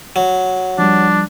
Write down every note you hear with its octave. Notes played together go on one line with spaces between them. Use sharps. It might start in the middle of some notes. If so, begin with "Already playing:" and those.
F#3
F3 G3 D4